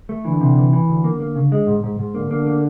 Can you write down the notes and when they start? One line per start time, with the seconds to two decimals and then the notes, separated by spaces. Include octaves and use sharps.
0.09 A3
0.25 D3 E3
0.41 C3
0.57 E3
0.73 E3
0.88 D2 D3
1.04 A#3
1.20 A#3
1.36 C#3
1.52 G#3
1.67 G#2
1.84 G#2
2.00 G#2
2.15 D3 A#3
2.31 A#3
2.46 A#3